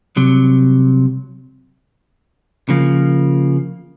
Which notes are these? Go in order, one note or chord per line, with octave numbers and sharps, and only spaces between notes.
C2 C3 F#3
C#3 F3 A#3